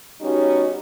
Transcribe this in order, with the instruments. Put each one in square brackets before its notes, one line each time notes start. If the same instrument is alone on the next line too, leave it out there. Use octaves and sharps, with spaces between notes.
[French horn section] G3 B3 C#4 D#4 F#4